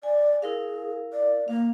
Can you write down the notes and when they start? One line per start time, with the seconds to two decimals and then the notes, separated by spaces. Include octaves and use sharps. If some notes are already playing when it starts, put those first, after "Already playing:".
0.03 D5 G#5
0.42 E4 G#4 A#4 F5
1.13 D5
1.48 A#3 F5